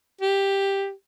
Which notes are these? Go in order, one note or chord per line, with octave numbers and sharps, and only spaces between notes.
G4